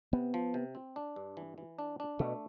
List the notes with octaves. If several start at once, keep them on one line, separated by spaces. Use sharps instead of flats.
C3 B3
F3
C3
C4
D4
G2
E3
E3
D4
D4
B2 A3